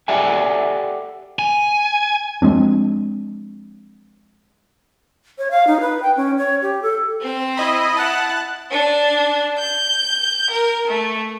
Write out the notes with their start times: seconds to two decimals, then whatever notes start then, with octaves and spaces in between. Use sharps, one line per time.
0.08 G4 A4 D5 E5 F#5 G#5
1.39 G#5
2.42 F3 G#3 C4 D4
5.38 C#5
5.51 F5
5.67 D#4
5.80 B4
6.03 G5
6.16 C#4
6.38 C#5
6.62 G4
6.82 A4
7.20 C4 C5
7.57 E4 D#5 B5
7.97 E4 F#5 A5 F#6
8.72 D4
9.59 G6
10.51 A#4
10.88 A3